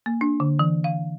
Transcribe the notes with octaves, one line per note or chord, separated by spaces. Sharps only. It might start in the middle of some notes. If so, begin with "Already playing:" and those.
A#3
D4
D3
E3
F5